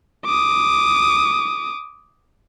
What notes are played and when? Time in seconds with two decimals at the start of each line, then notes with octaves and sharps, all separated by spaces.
0.25 D6 D#6